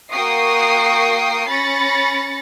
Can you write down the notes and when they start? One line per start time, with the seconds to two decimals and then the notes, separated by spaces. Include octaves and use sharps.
0.11 A#3 F#4 G5 C#6 D#6 C7
1.49 C#4 B5 A6 A#6 C#7